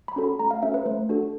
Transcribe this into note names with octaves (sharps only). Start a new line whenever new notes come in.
B5
C#4 F#4 A4
B5
A3 A#5
F5
C#4 F#4 A4 E5
B4
A3 C5
D4 F#4 A4